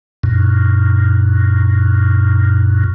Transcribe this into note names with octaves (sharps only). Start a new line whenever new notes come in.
F#2 A#2